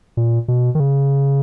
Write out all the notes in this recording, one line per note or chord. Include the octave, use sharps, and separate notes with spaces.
A#2
B2
D#3
C#3